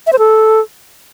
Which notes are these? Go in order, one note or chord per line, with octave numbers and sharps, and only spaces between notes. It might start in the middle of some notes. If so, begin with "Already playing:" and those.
E5
C5
A4